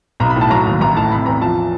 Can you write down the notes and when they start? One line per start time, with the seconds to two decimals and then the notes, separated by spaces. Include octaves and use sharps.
0.20 B1 A#5
0.30 B5
0.36 A2
0.41 A5
0.50 F#3 A#5
0.66 D#2
0.81 A1 A#5
0.96 A2 A5
1.11 C3 B5
1.26 E2 A#5
1.41 F3 A5